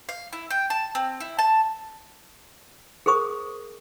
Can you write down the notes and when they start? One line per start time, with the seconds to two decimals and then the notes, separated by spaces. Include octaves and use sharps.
0.09 F5
0.33 E4
0.50 G5
0.70 A5
0.95 C4
1.20 E4
1.39 A5
3.06 G#4 A#4 C5 C#6 D#6